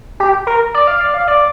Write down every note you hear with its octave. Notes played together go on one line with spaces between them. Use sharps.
G4
A#4
D5
F5
D5
F5
D5